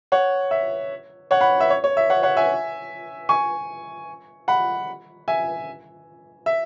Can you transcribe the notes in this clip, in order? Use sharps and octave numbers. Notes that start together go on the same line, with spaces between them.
C#5 F#5
E5
C#5 F#5
F#5 B5
E5
C#5
C#5
E5
C#5 F#5
C#5 F#5
E5 G#5
G#5 C#6
F#5 B5
E5 G#5
E5